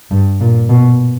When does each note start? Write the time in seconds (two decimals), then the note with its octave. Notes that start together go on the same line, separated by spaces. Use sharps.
0.11 G2
0.40 A#2
0.69 B2